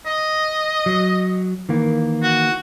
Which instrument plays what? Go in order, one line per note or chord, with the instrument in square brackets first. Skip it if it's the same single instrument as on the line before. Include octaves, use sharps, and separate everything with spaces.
[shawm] D#5
[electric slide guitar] F#3
D#3 E3 A#3
[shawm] F#4